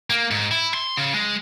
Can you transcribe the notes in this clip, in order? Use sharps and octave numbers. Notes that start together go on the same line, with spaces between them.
A#3
G#2
E4
C6
C#3
G#3